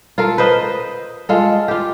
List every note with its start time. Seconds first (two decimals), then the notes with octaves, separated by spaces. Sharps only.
0.18 F4 A4 A#4 F5
0.38 B4 C5 D#5
1.29 G#3 F4 A4
1.68 F4 G4